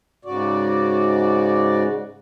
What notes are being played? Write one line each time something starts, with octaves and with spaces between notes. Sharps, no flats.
G#2 C#3 F#4 D5